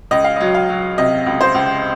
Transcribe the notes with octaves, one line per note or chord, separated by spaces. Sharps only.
C#2 D#5
F5
F#3 D#5
F5
F#3
C3 D#5
C#2
C5
C#2